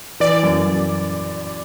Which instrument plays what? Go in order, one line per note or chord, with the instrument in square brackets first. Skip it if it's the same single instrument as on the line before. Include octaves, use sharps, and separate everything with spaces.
[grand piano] E3 [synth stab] D5
[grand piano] F#2
F#2